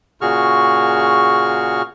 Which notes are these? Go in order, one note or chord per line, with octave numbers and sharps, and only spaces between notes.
A#2 C#3 F#4 G#4 C#6 F6